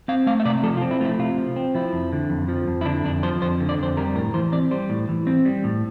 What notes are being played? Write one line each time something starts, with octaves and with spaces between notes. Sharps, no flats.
C4 F5
A3 F5
E5
C3 D5
F3 A4
F4
C4
E4
A3 E4 F4
C3 F4
F3
C4
F3 E4
F2
D3
F2
F3
F2
E4
D3 D4
F2 D4
F3 C5
F2 C5
D3
D5
F2 C5
G3 A#4
A2 A#4
E3 C5
C4 D5
G3 C5
A2
E3
C4
G3
A2